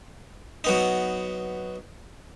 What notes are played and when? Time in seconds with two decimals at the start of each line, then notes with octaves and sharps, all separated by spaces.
0.64 F#3 B3 D#4